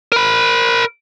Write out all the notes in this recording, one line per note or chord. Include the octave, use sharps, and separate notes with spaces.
A#4 B5